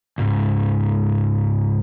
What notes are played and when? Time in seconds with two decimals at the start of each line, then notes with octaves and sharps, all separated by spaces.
0.18 C#2 G#2